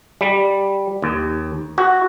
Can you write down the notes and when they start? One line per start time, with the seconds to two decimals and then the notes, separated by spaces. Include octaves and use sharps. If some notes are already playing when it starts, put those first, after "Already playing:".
0.21 G3
1.02 D#2
1.78 F#4